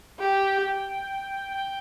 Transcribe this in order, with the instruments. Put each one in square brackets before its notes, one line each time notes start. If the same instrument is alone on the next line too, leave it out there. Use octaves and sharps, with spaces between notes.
[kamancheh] G4 [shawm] G5
[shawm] G5